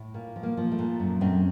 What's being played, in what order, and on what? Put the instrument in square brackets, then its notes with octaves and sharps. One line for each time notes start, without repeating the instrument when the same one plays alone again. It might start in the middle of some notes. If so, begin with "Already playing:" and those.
Already playing: [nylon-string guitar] A2
A#2 A#3
F3
A#3
F3
A3
A#2
F#2
F#2 A3 C4